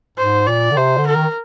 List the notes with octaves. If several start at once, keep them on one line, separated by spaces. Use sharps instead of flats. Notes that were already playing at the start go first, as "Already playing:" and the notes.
G#2 C5
A#2 D5
D3
C3 C5
D3
A#4
D#3